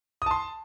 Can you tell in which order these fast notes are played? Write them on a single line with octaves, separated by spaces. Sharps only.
D#6 A5 C6